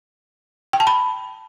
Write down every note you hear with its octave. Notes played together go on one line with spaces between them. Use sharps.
G5
A5
B5